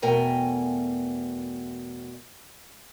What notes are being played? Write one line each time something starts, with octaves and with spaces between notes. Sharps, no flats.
E2 B2 A3 A#4 G5 G#5